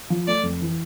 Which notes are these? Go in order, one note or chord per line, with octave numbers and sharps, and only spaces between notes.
F3
A3 D5
F2
E3